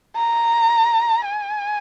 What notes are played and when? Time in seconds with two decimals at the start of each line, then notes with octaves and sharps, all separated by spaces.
0.16 A#5
1.25 G#5